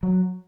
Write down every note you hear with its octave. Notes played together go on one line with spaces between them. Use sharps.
F#3